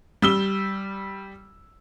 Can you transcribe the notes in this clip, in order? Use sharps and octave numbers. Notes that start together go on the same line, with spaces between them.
G3 E6 G7